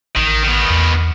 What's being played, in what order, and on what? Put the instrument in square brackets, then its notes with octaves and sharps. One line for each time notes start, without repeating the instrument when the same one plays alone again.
[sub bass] A1 [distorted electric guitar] D#3
[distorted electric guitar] D#3 B3
[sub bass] E2